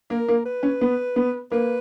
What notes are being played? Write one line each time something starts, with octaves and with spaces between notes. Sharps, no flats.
A#3 A#4
A#3
B4
C#4
B3
B3
A#3 B4